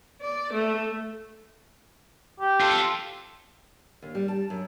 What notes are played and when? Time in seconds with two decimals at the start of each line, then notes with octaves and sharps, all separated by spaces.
0.21 D5
0.53 A3
2.40 G4
2.60 F4 A4
4.02 D#2
4.15 G3
4.28 A5
4.50 F#2